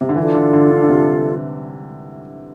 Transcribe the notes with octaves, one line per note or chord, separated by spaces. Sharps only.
C3
D3
E3 D4 F4 A4
D3
D3
D3
D3
C3